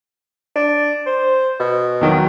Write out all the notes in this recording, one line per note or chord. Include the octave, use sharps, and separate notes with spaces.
D4
C5
B2
E2 D#3 F#3